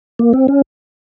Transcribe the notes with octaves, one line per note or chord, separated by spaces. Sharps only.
A#3
C4
C#4